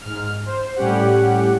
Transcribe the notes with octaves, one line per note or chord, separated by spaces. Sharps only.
G#2 F6
C5
A2 G3 C#4 G4 F#5